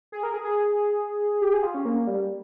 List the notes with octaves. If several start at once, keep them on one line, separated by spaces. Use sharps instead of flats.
G#4
A#4
G#4
G#4
G4
G#4
F4
C#4
A#3
G3